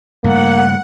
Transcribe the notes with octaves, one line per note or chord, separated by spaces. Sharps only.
G2 C#3 A3 A#3 F#5